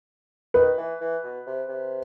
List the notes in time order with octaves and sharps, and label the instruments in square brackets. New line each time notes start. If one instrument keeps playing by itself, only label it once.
[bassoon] D#3 [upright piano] B4
[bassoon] E3
E3
B2
C3
C3